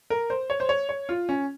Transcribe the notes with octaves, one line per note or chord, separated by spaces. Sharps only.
A#4
C5
C#5
C5
C#5
C#5
F4
C#4